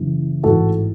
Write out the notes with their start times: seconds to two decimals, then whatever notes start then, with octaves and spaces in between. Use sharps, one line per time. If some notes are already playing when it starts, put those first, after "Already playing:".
Already playing: F#1 F#2 E3
0.43 A1 G#2 E3 F#4 A4